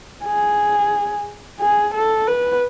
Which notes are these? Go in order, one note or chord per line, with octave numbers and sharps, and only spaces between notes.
G#4
G#4
A4
B4